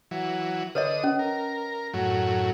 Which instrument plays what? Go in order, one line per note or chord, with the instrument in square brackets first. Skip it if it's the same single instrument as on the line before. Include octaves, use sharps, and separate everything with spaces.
[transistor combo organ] E3 F#3
[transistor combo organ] D3 D#6 [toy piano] B4 C#5 D#5
[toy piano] C#4
[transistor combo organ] A#4
F#2 A2 F#3